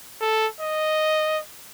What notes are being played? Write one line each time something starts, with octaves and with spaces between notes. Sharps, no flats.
A4
D#5